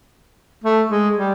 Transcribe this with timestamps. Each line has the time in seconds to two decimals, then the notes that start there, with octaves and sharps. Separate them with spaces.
0.64 A3
0.90 G#3
1.17 G3